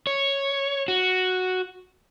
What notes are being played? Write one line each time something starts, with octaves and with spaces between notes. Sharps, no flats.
C#5
F#4